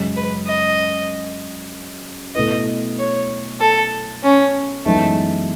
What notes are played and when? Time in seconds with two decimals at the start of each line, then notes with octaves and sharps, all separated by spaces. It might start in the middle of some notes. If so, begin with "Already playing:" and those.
Already playing: F#2 C#3 G#3 C#4
0.16 B4
0.47 D#5
2.35 B2 A3 E4 B4 D#5
2.98 C#5
3.60 A4
4.23 C#4
4.86 F#2 E3 G#3 A3 B3 D#4